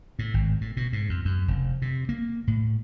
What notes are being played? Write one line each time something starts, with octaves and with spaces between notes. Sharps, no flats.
A2
G#1
A2
B2
G#2
F2
F#2
F1
C3
A#3
A2